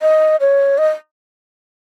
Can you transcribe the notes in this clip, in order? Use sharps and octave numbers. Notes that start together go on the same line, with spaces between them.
D#5
C#5
D#5